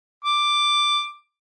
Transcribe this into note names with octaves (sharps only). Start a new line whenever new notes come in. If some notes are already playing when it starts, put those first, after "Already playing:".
D6